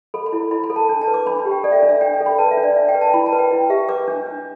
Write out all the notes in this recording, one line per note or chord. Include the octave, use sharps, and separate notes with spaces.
A4 B5
B5
E4
E4 B5
B5
A4
A5
D4 A5
A5
B4
D6
D4 B5
B5
G4
G5
A4 D5
E5
D5
D4
E5
D4 G5
G5
A4
B5
B4 A5
E5
D4
D5
D4 E5
G5
B4
A5
E4 B5
A5
B4
G5
E4
G4 E5
B4 D6
D4
D4